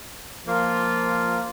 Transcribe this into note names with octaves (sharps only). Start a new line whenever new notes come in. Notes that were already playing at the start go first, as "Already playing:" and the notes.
F3 A#3 F4